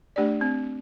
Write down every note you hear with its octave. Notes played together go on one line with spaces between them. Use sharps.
A3 D4 G4 D5
C4